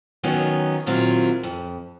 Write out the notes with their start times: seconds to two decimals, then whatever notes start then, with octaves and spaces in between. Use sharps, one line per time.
0.23 D#3 F#3 B3 C#4 D#4
0.86 A#2 D#3 F#3 C4 E4 F4
1.43 F2